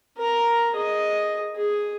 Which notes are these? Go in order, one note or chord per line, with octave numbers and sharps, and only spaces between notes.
A#4 A#5
G#4 D#5
G#4